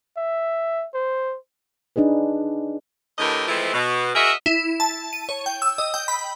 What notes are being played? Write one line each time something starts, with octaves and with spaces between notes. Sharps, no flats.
E5
C5
D4 D#4 G#4 B4
A2 D3 E3 G4 A#4 D#5
E3 F3 G#3 A3 C4 E4
B2
F#4 G#4 A#4 D#5 E5
E4
A5
D#7
C#5
G5
E6
D#5
G5
B5